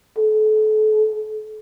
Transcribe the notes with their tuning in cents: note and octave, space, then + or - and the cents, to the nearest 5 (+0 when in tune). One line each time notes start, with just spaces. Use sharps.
A4 -35